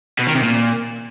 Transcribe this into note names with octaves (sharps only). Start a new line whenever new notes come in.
B2
D#3
C3
A#2